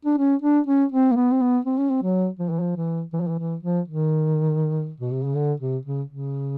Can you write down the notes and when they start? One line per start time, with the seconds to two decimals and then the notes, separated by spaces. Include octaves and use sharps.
0.05 D4
0.18 C#4
0.42 D4
0.67 C#4
0.92 C4
1.12 A#3
1.16 B3
1.32 C4
1.41 B3
1.65 C4
1.78 C#4
1.90 C4
2.03 F#3
2.40 F3
2.50 E3
2.60 F3
2.77 E3
3.13 E3
3.21 F3
3.28 E3
3.39 E3
3.63 F3
3.88 D#3
5.00 B2
5.13 C3
5.25 C#3
5.36 D3
5.60 C3
5.85 C#3
6.11 C#3